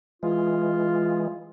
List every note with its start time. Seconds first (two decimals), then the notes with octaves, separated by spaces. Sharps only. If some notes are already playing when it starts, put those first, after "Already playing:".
0.23 E3 G#3 F4